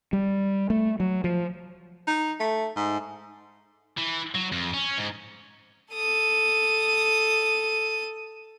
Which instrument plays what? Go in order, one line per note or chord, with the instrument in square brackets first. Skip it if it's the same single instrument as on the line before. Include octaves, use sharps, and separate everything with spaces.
[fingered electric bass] G3
A3
F#3
F3
[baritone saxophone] D#4
A3
G#2
[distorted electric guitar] E3
F#3
F2
C#4
G#2
[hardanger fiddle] A4 D#6